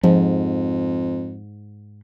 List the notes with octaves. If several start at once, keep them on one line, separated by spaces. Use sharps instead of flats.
F2 G#2 F3